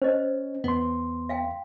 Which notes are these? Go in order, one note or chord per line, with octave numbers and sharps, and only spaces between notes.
C#4 C5 D#5
E2 B3 C6
E5 F5 G5